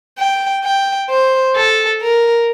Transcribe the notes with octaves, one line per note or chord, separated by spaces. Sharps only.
G5
G5
C5
A4
A#4